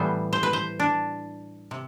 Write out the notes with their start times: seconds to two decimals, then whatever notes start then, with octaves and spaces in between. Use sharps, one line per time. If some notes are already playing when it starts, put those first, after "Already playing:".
Already playing: A2 E3 G3 B3 C5
0.33 C5
0.43 B4
0.53 C5
0.80 D4
1.71 C3